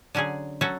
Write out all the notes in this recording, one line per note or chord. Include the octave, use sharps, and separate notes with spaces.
D3 F#3 C#4 G#4
F#3 C#4 F#4 A4